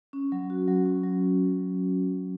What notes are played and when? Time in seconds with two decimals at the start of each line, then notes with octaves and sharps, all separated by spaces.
0.13 C#4
0.32 F#3
0.50 F#4
0.68 F#3
0.86 C#4
1.03 F#3